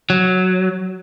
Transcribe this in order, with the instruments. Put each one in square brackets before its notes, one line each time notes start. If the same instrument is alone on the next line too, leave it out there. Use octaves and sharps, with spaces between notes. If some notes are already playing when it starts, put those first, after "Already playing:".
[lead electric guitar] F#3